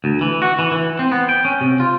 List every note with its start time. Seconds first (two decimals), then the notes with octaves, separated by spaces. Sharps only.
0.04 D2
0.21 E3
0.42 F#4
0.59 E3
0.71 E3
0.99 C4
1.12 B3
1.29 G5
1.45 C#4
1.61 C3
1.80 F4